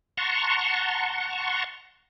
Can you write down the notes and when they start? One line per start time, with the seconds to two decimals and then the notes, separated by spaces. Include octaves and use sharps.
0.17 F#5 A5 A#5 C6 C#6